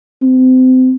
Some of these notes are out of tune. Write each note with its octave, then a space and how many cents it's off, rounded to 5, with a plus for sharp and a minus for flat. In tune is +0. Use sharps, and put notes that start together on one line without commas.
C4 -30